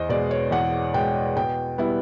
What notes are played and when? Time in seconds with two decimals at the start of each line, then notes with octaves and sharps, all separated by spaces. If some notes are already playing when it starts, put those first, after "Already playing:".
Already playing: E2 C5 D#5
0.09 B2 G#3 D5
0.31 C#5
0.51 E2 F#5
0.94 B2 G#3 G5
1.37 B2 G5
1.78 G3 B3 E4